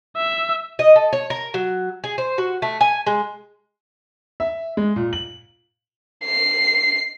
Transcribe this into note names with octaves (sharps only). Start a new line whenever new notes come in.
E5
D#5
A4
C#5
A#4
F#3
G#4
C5
F#4
A3
G#5
G#3
E5
G#3
A#2
F#7
C7